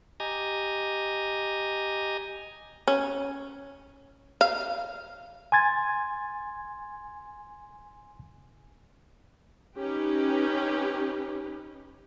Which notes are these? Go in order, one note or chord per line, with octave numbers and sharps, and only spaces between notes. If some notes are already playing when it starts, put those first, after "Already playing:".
G4 D#5 G#5 A#5
C#4
F5
G#5 C6 G#6 A6
C#4 D#4 G4 B4